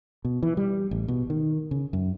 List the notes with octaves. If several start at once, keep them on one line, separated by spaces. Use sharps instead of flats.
B2
E3
G3
A1
B2
D#3
C#3
F#2